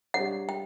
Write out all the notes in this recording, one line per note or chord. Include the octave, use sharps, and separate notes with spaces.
G3 D4 G4 C#5 F#5
G5